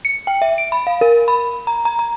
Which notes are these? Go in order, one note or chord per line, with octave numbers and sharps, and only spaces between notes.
C#7
G5
E5
D7
B5
F5
A#4
B5
A#5
A#5
A#5